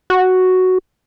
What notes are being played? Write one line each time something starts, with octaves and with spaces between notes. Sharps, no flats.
F#4